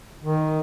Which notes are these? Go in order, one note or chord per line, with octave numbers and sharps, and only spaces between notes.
D#3